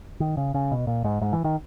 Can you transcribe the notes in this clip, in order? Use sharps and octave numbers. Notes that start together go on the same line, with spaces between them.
D#3
C#3
C#3
B2
A#2
G#2
G#2
E3
D#3